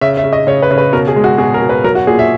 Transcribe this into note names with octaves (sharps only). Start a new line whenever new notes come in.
C#3 E5
E5
C#3
D#5
C#3 C#5
B4
C#3
B4
B2 A#4
G#4
G#3
F#4
B2 G#4
A#4
B2
B4
F#3 A#4
F#4
A#2 G#4
E5